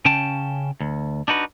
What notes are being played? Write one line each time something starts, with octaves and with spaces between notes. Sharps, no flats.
C#3 C#4 G5 A5
D2
D4 D#4 F#4 B4